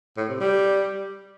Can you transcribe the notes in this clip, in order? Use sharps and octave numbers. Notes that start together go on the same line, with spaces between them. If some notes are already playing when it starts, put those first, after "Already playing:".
A2
C3
G3